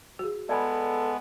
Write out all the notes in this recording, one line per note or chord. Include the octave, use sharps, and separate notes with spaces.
F#4 G#4
G#3 B3 A4 D5 G#5 B5